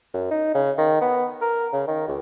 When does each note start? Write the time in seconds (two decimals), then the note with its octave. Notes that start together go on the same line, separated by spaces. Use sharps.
0.14 F#2
0.31 D#4
0.55 C#3
0.78 D#3
1.02 B3
1.41 A#4
1.73 C#3
1.87 D#3
2.08 C#2